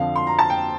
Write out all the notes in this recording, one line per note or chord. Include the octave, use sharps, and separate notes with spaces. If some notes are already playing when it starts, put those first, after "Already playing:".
Already playing: F2 D3 F3 F5
C6
A#5
A5
G5